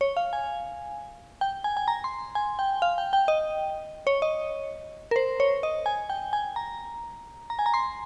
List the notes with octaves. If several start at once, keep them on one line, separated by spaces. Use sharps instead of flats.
C#5
F5
G#5
G5
G#5
G#5
A#5
C6
G#5
G5
F5
G5
G5
D#5
C#5
D#5
A#4
C5
C#5
D#5
G#5
G5
G#5
A#5
A#5
G#5
A#5
C6